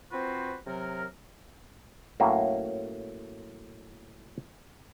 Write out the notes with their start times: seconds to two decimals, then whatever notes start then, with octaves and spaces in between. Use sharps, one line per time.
0.11 C4 F4 F#4 B4 C5
0.67 C3 F#3 A#4
2.20 A2 F#3 A#3 C#4